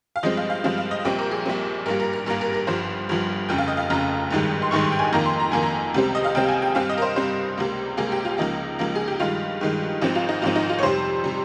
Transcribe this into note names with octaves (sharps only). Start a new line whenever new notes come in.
F5
G2 F3 G#3 C4 D#5
F5
F5
G2 F3 G#3 C4 F5
F5
D#5
A#1 A#2 G3 C4 G5
A#4
G#4
A#1 A#2 G3 C4
G#1 G2 G3 A#3 A#4
A#4
A#4
G#1 G2 G3 A#3 A#4
A#4
A#4
G1 G2 F3 C5
G1 G2 F3
F1 F2 C#3 G5
F5
D#5
F5
F1 F2 C#3 A#5
G#1 G2 D#3 G#3
C6
G#1 G2 D#3 G#3 C#6
C6
G5
G#5
F2 D#3 A#3 A#5
C6
A#5
F2 D#3 A#3 G#5
A#5
C#2 C3 G3 C4
D#5
F5
C#2 C3 G3 C4 G5
G#5
G5
G2 G3 C4 F5
D#5
A#4
C5
G2 G3 C4 C5
C#2 C3 G3 A#3
C#2 C3 G3 A#3 G#4
G4
F4
C#2 C#3 F3 A#3 D#4
C#2 C#3 F3 A#3
G#4
G4
G2 D#3 G#3 F4
G2 D#3 G#3
G#1 G#2 F3 C4 D#4
F4
D#4
G#1 G#2 F3 C4 F4
D#4
F4
C#5
F2 C3 G3 C5
C3 G3